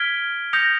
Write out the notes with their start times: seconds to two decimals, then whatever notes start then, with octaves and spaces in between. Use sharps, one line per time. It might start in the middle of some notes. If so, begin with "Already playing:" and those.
Already playing: F6 G#6 B6 D7 G7
0.53 D#6 G6 A#6 C#7 F7